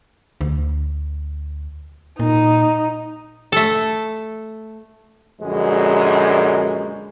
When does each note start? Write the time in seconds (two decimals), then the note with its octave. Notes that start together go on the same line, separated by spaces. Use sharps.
0.41 D2
2.19 A#2 D#4
3.52 A3 A4
5.40 A#1 F#2 D3 G#3